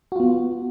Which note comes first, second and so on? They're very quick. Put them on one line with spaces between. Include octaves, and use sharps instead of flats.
F#4 F4 B3